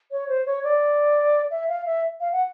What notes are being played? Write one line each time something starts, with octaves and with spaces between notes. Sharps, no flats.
C#5
C5
C#5
D5
E5
F5
E5
F5
F#5